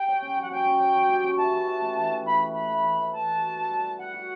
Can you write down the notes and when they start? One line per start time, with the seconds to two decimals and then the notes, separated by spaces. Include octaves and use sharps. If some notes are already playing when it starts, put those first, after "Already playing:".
Already playing: G4 G5
0.08 C#5
0.22 C#4
0.37 F#3
0.42 F#5
0.51 C#4 G5
0.66 C#4
0.80 C#5
0.95 F#3
1.09 G4
1.24 C#4
1.38 E4 A5
1.53 B4
1.67 E4
1.82 A3
1.96 E3
2.11 E4
2.26 E4 B5
2.40 B4
2.53 B4 B5
2.69 A3
2.84 E3
2.98 E3
3.12 B4 A5
3.27 F#4
3.41 B4
3.56 B4
3.70 G3
3.85 B4
3.99 B4 F#5
4.14 F#4